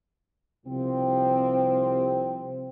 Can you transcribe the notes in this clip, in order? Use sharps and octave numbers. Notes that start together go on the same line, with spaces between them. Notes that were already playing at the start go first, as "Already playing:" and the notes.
C2 C3 F3 C4